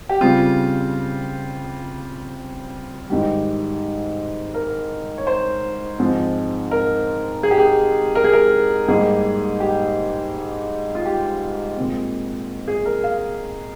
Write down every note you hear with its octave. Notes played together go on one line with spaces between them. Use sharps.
G4
C#3 G3 C4 F4
G#2 D#3 G3 G4
A#4
C#5
C5
G#2 F3 G#3 C4
A#4
G#4
G4
G#4
A#4
G#4
A#4
G#2 G3 A#3 G#4
G4
F4
G4
A#2 G#3 C4
G#4
A#4
F5